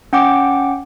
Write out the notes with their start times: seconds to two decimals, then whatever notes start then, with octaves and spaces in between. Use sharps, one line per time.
0.13 C#4 F#5 G5 D6